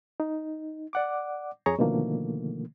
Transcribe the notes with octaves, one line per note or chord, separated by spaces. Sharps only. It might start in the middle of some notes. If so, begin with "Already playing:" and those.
D#4
D5 F#5 D6
F2 G#4 C#5 A#5 C#6
B2 D3 D#3 F3 A3 A#3